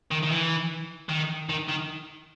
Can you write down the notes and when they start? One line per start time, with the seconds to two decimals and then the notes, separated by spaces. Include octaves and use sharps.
0.11 D#3
0.23 D#3
0.31 E3
1.09 D#3
1.49 D#3
1.69 D#3